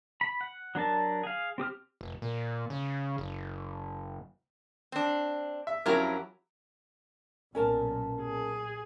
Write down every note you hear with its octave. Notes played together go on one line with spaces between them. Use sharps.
B5
F#5
F#3 D4 A#4 A5
G#4 F5
C4 G4 D#6 F6
F1
A#2
C#3
F#1
C4 D4
E5
F2 F#3 C#4 E4 G4 A#4
B1 A#2 C#4 A#4 A5
A#2 G#4